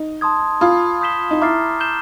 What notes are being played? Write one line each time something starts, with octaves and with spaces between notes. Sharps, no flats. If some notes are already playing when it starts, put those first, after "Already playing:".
Already playing: D#4
A5 C6 D#6 G#6
F4 B5 D#6 G#6
D#6 G6 B6 E7 G7
D#4
E4 A#5 D6 F6 A6 C7
G6 C7 E7 G7